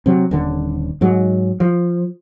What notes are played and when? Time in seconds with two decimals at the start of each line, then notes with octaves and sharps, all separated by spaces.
0.06 C3 F#3
0.31 D#1 D3
1.01 G#2 F#3
1.60 F3